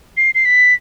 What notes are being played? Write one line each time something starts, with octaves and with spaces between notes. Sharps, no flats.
C7
C7
B6